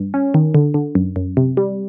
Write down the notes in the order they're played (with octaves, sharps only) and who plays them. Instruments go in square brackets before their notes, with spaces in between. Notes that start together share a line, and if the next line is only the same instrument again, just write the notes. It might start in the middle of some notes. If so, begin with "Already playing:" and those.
Already playing: [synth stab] G2
C#4
D#3
D3
D3
F#2
F#2
C3
G3